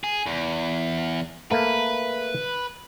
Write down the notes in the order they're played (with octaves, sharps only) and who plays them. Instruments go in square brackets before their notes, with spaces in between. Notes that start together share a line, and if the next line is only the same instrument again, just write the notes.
[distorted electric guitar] G#4
E2
[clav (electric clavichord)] A3 A#3 [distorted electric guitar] B4